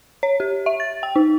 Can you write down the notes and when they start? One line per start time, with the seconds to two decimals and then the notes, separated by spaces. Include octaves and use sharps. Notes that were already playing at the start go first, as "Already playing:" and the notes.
0.23 C#5
0.40 G4
0.66 E5
0.80 A6
1.03 G5
1.16 D#4